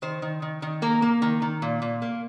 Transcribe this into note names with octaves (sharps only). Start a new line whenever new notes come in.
D#3 C5
D#3
D#3
D#3
A#3 A#4
A#3
D#3
D#3
A#2
A#2
A#3